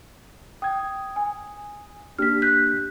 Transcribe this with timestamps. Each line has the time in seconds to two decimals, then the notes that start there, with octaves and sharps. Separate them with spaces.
0.62 G5 D#6 G#6
1.16 G#5
2.19 A#3 D4 G4 F6 B6
2.42 F#6 G6 B6